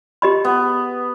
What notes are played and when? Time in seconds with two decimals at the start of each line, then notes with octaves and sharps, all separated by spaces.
0.22 G4 D#5 B5
0.45 B3